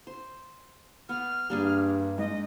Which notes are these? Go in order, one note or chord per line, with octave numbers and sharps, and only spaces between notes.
C5
B3 F6
G2 G3 A#3 D4 G#4
G#2 D#5